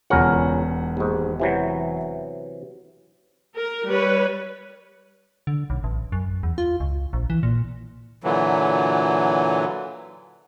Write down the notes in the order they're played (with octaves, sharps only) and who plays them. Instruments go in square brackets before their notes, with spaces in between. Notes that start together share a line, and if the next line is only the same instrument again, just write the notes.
[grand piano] E1 F#5 [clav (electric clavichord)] C#2 C#4 A#4
[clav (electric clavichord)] D#2 G#2
C3 E3 F#3
[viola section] A#4
G3 B4 C#5
[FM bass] D3
B1
A1
F#2
E2
F4
C#2
A#1
E3
A#2
[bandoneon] A#2 D3 E3 F#3